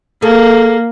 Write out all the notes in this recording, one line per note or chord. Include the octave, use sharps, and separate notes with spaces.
A#3 G#4 A4